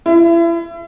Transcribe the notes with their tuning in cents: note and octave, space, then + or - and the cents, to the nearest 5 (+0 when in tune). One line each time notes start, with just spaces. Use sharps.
E4 +35